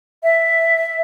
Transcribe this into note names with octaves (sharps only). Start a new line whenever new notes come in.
E5